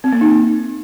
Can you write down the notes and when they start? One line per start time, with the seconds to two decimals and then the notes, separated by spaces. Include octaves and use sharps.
0.04 C4
0.13 A#3
0.21 D#4